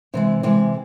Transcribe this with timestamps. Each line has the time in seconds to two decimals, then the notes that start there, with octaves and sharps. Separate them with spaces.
0.14 C3 E3 G#3
0.43 C3 E3 G#3